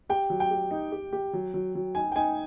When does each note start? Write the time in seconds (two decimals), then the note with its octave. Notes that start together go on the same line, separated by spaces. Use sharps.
0.09 G4 G5
0.30 F#3
0.40 G5
0.51 G4
0.71 D#4
0.92 G4
1.13 G4
1.33 F#3
1.54 F#3
1.75 F#3
1.95 D#4 G#5
2.12 G5
2.15 D#4 G#5